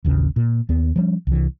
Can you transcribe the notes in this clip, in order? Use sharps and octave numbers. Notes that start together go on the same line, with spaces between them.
A1 D#2 C#3
A#2
D#2 B3
F3 G3 A3 C#4
C2 E3